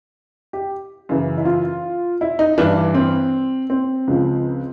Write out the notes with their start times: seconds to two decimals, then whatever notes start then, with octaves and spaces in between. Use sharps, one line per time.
0.53 G4
1.09 F#2 C#3 E3
1.38 E4
1.45 F4
2.21 E4
2.39 D#4
2.58 G2 E3 D4
2.94 C4
3.70 C4
4.07 C#2 C#3 F3